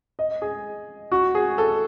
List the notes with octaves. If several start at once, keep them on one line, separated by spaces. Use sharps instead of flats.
D#5
G#4
F#4
G#4
A4